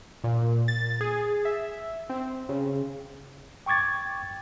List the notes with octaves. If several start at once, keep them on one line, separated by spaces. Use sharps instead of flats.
A#2
A6
G#4
E5
C4
C#3
G5 C#6 D6 G#6 A6